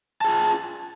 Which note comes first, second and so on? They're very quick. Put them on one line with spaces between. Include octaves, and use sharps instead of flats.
A5 G#4 F4